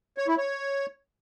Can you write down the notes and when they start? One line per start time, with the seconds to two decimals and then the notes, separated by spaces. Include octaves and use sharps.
0.18 C#5
0.28 E4
0.38 C#5